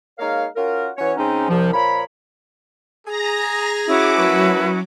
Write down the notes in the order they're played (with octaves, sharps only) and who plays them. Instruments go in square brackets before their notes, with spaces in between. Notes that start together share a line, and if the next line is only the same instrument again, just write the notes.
[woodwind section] G#3 A#3 D#4 A#4 C#5 F5
C#4 F4 F#4 A#4
E3 C#4 F#4 C#5
C#3 G#3 C4 C#4 D#4
C2 F3
A#2 F3 A#4 C#5 B5
[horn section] G#4 [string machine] A#5 A#6
[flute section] C#4 E4 F#4 [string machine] D6
[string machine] F#3 [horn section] A3 A#4 B4